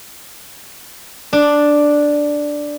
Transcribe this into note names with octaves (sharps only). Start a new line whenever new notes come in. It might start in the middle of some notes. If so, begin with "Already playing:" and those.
D4